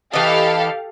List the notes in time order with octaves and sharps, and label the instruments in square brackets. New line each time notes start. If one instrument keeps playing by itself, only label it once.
[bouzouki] E3 D#5 [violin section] G4 A4 F5